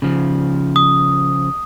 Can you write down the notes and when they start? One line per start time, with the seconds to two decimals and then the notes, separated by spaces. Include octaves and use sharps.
0.02 C#3 F3
0.76 D#6